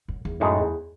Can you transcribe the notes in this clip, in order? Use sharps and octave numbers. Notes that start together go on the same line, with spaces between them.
F#2
E2
F#2 A2 G#3 D#4
E2